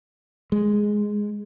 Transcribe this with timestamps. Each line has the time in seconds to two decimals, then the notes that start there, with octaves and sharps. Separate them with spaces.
0.52 G#3